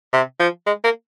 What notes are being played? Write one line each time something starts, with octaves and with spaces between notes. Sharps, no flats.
C3
F3
G#3
A#3